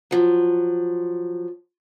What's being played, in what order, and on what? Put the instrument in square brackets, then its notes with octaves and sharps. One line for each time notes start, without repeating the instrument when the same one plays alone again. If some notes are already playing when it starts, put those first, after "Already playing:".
[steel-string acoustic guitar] F3 F#3